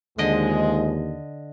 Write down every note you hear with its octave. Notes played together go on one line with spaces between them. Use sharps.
D#2 G#2 D3 F3 G#3 D#5